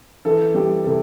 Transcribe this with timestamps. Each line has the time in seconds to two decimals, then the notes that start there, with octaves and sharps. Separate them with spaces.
0.25 E3 A4
0.54 G3 G4
0.84 C3 A4